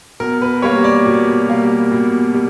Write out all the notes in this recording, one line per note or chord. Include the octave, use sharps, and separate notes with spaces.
B2 A#4
B4
G3 A#3 C#5
D5
B2
G3 A#3
B2
G3